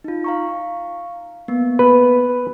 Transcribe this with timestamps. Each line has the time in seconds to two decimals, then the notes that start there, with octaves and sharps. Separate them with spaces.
0.04 D#4 F4
0.24 F5 A#5 C#6
1.48 A#3 B3
1.79 B4